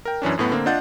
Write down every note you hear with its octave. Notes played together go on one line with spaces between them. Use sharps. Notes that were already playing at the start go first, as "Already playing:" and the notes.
A#4 G5
F#2 E3 C#4 D4
F#2 A2 B3
D3 A#3 C4
D4 F4 D#5 F#5 G6 A6